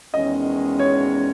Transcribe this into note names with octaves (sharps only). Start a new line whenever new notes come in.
E2 D#3 G#3 C#4 D#5
C#5